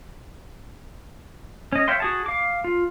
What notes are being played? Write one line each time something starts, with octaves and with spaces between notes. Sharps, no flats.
C#4 D#5
C#5 E5 F5 G5 C6
F#4 G#4 A5
F5 D6
F4